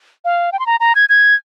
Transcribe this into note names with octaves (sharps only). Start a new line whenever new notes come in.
F5
G5
C6
A#5
A#5
G#6
G#6